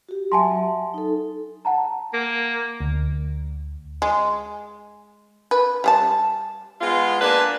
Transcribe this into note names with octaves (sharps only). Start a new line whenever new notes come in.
F#4 G4
F#3 E5 G#5 A5 C6
D#4 A4
F#5 A5 A#5
A#3
D2
G#3
B4
G3 G#4 A5
G#3 B3 F4
A#3 D4 B4 G#5 A5